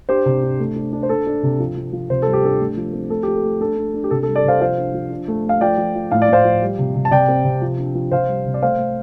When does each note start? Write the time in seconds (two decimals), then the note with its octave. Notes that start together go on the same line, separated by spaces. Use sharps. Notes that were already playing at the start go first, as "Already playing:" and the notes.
0.09 D4 G4 C5
0.26 C3
0.43 D4
0.59 A3
0.76 D4
0.93 D4
1.03 C5
1.09 D4 A4
1.27 D4
1.43 C3
1.60 F3
1.77 F3
1.93 F3
2.10 C3 C5
2.22 G3 A4
2.33 G4
2.43 D4 A4
2.59 A3
2.77 F3
2.93 C4
3.10 A3 A4
3.23 F3 G4
3.35 A4
3.44 A3
3.61 D4 A4
3.77 D4
3.94 D4
4.04 G4
4.11 C3 A4
4.23 A4
4.28 G3
4.36 A4 D5
4.45 C3 C5 F5
4.61 F3 C5 F5
4.78 D4
4.94 F3
5.10 D4
5.28 A3
5.45 A3 F5
5.61 F3 D5 G5
5.78 F3
5.95 F3
6.11 A2 F5
6.22 D5
6.29 A2 C5 F5
6.44 F3
6.62 G3
6.79 C3
6.95 C3
7.05 A5
7.11 C3 D5 G5
7.28 C4
7.45 C3
7.62 F3
7.78 D4
7.95 F3
8.12 C3 C5 F5
8.28 G3
8.46 C3
8.54 D5
8.62 A3 C5 F5
8.79 A3